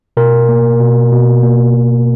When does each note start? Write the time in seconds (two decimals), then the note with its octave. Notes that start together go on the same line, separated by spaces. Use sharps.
0.17 B2 A#4
0.49 A#3
0.80 B2
1.12 B2
1.43 A#3
1.74 B2